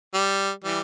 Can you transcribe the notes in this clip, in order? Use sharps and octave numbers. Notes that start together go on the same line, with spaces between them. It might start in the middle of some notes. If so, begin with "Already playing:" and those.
G3
E3 G3